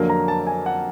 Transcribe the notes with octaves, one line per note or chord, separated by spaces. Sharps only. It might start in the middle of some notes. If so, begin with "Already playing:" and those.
Already playing: F2 D3 F#3 A#3
A#5
A5
G#5
F#5